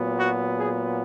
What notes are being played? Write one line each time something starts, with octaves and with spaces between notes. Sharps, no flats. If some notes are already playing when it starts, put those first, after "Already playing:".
Already playing: A#2 F#3 B3
F#4
G#4